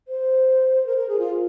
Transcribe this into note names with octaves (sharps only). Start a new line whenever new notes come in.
C5
A#4
A#4
G#4
F4